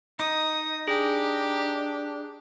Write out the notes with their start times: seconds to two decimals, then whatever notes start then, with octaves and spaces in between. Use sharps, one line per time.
0.20 D#4 D#6
0.88 D4 G4 G#4